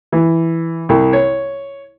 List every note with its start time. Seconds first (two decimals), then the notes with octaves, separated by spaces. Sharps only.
0.12 E3
0.89 C2
1.13 C#5